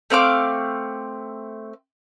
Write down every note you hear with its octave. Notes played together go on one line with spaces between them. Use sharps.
A3 C4 F5 D6